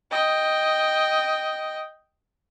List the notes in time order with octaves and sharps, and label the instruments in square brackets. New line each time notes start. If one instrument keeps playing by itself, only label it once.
[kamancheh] D#5 G5